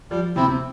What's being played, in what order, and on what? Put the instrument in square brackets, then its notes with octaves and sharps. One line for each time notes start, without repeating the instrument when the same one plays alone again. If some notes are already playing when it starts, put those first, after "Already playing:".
[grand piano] F3 [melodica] G3
[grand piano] C3 [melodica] C4 E4
[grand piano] C3